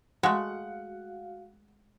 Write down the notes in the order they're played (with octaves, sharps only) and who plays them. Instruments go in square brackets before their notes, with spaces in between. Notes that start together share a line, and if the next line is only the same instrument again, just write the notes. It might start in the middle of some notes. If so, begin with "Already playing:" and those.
[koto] G#3 A3 [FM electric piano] F#4 F5 [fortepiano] F#5